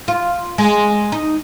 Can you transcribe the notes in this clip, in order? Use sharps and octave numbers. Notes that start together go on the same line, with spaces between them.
F4
G#3
D#4